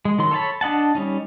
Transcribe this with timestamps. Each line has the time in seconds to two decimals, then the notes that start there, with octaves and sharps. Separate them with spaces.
0.05 G#3
0.19 D#3 F#3 C6
0.31 A4 C#5 D#5 A5 B5
0.61 D4 D#5 F#5 A5
0.95 G3 C#4 D#4